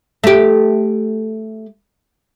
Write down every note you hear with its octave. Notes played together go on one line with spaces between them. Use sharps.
A3 G4